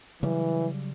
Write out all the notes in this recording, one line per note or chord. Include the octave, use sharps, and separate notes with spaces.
C#3 E3 F#3 G3